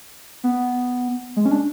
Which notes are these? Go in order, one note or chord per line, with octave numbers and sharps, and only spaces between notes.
B3
G#3
C#4
D4